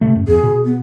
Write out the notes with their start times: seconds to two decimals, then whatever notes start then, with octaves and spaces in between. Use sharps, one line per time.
0.01 C3 A3
0.15 F#2
0.28 E2 G#4
0.43 B2
0.65 B3